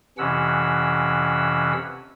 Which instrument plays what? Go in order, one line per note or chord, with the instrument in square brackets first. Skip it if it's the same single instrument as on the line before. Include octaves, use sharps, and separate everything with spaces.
[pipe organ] F2 C3 E3 C#4 F#5 E6